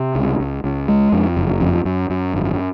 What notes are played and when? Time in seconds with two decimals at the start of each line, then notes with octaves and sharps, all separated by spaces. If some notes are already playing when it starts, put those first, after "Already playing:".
Already playing: C3
0.15 C#2
0.40 C#2
0.64 C#2
0.88 G#3
1.12 F2
1.37 F#1
1.61 F2
1.85 F#2
2.10 F#2
2.34 G#1